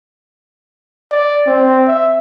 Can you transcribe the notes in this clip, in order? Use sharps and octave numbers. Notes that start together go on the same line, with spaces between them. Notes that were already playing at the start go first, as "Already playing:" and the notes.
D5
C4
E5